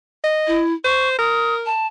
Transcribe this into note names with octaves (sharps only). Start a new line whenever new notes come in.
D#5
E4
C5 C#6
A#4 D#6
A5